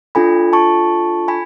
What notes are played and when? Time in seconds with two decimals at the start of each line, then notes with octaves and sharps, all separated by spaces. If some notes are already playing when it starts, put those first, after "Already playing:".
0.15 D4 F4 A4 G#5 B5
0.53 A5 C#6
1.28 G#5 B5